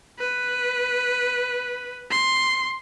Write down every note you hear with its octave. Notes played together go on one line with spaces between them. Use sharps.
B4
C6